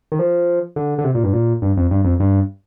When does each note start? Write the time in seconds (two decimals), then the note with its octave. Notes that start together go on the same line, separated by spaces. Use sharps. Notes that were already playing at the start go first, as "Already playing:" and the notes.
0.12 D#3
0.19 F3
0.76 D3
0.98 D3
1.04 C3
1.15 A#2
1.24 G2
1.33 A#2
1.62 G2
1.77 F2
1.91 G2
2.04 F2
2.20 G2